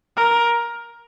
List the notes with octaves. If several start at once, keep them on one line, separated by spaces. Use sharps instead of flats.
A#4